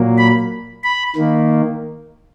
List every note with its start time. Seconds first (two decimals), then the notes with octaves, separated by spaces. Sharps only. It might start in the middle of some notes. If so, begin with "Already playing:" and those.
Already playing: A#2 F#3 A#3
0.18 B5
0.83 B5
1.16 D#3 A#3